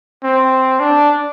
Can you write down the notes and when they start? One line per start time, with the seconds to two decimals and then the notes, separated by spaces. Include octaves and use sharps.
0.23 C4
0.80 D4